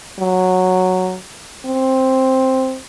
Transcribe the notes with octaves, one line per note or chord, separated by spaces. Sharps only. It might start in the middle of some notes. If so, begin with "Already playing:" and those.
F#3
C4